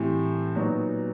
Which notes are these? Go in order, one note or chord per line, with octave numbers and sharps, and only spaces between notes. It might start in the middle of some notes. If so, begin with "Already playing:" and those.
Already playing: A2 E3 G3 C4
A#2 F#3 B3 D#4 F#4